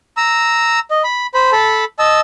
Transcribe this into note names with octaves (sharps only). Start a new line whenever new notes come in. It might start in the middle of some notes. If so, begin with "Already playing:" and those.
A#5 E6
D#5
B5
C5 B5
A4 A5 B5
D#5 A5 E6